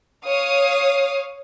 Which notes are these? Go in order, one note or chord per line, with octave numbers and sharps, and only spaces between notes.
C#5 F5 D#6